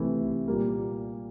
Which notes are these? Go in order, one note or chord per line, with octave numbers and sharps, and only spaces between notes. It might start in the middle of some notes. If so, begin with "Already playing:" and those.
Already playing: C3 E3 A3
A#2 G3 A#3